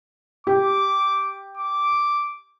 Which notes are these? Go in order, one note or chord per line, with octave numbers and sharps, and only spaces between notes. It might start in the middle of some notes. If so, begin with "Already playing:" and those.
G4 D6
D6